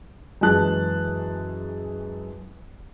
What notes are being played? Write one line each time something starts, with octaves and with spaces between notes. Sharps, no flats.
F#2 E3 G#3 G#4 A5 F#6